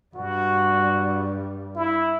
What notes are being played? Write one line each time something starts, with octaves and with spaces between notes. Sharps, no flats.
G2 G3 F#4
E4